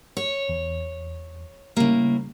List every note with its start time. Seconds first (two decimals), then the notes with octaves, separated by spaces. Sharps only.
0.17 C#5
0.49 E2
1.77 A2 C#3 G3 A#3